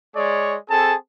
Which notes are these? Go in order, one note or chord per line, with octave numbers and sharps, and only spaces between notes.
G#3 G#4 C#5 D5
C4 G#4 A4 A5